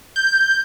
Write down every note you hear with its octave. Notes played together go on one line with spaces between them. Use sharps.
G6